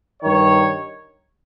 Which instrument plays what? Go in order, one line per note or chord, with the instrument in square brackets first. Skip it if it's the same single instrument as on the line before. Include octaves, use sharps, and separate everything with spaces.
[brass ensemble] G2 D#3 C#5